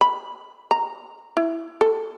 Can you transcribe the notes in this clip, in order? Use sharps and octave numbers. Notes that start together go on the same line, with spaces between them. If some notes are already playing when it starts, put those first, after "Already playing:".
B5
A#5
E4
A4